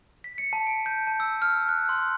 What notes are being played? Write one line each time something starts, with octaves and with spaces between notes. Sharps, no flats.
B6
C#7
A5
D7
G6
A5
E6
F6
F#6
C6